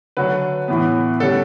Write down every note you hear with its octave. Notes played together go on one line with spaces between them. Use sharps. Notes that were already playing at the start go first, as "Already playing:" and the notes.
D3 F#3 A3 B4
A2 E3 B3
D3 G3 C#4 A4